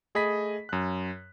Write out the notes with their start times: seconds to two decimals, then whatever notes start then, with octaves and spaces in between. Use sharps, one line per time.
0.15 A3 G#4 D#5 B5 B6
0.69 F#2 F#6